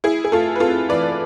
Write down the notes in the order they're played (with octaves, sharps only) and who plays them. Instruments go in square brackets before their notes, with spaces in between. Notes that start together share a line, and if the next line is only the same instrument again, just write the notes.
[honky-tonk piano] E4 G#4
G#4
A3 F4 A4
B4
C4 F4 A4
E3 B4 D5